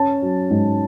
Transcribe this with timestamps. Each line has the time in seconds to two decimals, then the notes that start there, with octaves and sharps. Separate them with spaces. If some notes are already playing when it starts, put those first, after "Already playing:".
Already playing: C#4 A5
0.22 F#3
0.51 G#2